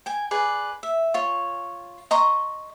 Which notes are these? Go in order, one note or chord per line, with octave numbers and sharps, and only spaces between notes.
G5 G#5
G#4 B4 D5
E5
F4 C#5
D#5 A#5 C6 C#6